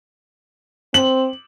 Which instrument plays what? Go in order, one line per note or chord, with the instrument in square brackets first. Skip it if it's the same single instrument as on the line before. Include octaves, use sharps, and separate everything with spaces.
[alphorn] C4 [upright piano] F#7